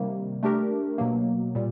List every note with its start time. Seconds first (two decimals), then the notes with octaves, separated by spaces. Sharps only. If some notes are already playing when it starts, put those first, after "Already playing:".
Already playing: C3 D#3 G3 A#3
0.43 A3 D4 G4 A#4
0.98 B2 F#3 A#3
1.55 A#2 G3